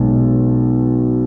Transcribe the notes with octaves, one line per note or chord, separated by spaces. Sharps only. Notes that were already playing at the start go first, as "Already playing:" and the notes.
Already playing: B1 B2 G#3